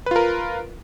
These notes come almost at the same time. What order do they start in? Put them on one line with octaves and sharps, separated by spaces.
B4 F4 A#4